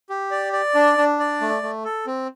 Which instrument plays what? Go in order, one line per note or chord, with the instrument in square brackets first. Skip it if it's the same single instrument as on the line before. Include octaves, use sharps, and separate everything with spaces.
[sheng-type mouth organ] G4
D5
D5
D4
D4
D5
A3
A3
A4
C4